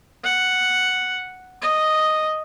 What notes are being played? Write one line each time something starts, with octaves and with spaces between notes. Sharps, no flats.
F#5
D#5